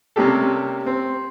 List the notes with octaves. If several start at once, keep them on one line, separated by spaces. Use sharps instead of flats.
C3 G3 A#3 C#4 G4 A4
C4